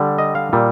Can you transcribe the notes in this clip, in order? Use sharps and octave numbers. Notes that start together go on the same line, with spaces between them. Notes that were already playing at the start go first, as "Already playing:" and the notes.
Already playing: D3 G3
D#5
F5
A#2 G3